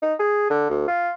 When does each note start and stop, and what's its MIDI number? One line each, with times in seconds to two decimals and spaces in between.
0.02 0.14 63
0.19 0.47 68
0.50 0.69 50
0.70 0.84 38
0.88 1.12 65